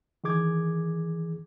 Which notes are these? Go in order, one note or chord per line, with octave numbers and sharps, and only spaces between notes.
D#3 E3 G#4 D6 G#6